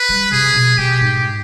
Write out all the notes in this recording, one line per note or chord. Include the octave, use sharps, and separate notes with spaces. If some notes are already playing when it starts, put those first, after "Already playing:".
Already playing: B4
G3
C3 G#4
B2
B2 G4
G#2